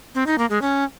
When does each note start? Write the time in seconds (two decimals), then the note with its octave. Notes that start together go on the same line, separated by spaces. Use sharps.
0.15 C4
0.26 D#4
0.38 A#3
0.50 G#3
0.62 C#4